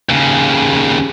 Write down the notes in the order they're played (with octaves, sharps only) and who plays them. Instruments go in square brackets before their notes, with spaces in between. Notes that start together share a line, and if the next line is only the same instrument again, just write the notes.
[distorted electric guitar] D#2 C#3